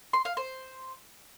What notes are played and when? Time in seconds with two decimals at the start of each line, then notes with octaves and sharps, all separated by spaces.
0.13 C6
0.25 F5
0.37 C5